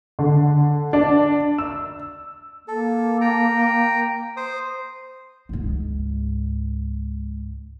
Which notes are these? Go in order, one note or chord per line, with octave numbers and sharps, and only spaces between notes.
D3
D4
E6
A#3 A4
G5 A#5
C5 D#6
C#2 G#2